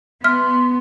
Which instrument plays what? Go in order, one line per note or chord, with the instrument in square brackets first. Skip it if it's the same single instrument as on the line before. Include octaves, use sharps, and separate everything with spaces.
[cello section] B3 [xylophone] E5 F6 B6 [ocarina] C6